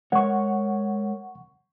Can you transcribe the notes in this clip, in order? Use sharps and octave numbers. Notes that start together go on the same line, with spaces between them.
G#3 A#4 C#5 F#5 C#6